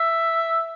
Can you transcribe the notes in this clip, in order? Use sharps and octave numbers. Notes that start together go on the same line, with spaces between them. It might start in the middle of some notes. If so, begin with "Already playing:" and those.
Already playing: E5